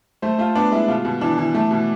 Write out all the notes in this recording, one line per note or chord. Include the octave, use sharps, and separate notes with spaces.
A3 C5
A3 F4
B3 D4
G#3 E4
B2 F4
B2
E3 D4
E3
A3
B2